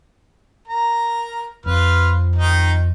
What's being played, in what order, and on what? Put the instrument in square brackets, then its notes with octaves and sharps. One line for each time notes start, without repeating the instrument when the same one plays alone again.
[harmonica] A#4 A#5
[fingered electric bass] F2 [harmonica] F4 B4 F6
[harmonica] D#3 D#4